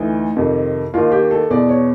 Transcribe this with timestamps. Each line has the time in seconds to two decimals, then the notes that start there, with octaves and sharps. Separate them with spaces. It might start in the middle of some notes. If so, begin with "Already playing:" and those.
Already playing: D2 E3 D#4
0.36 F2 C3 D#3
0.94 D#2 D#3 F4
1.12 G4
1.31 A4
1.50 E2 B2 D5
1.69 C#5